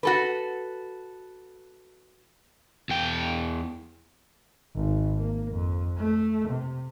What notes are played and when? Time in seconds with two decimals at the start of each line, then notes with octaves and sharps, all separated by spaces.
0.03 F#4 A4 B4
2.89 E2 G5
4.75 G#1
5.15 A#3
5.50 F2
5.98 A3
6.49 C3